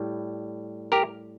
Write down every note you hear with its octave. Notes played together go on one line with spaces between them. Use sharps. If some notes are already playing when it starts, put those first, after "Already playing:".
Already playing: A2 G3
G4 A#4